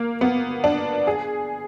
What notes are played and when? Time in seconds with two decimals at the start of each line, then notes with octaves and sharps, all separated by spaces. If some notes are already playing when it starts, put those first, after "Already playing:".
Already playing: A#3
0.21 B3
0.64 D4
1.07 G#4